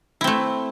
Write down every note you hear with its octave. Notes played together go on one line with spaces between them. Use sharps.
A3 C4 E4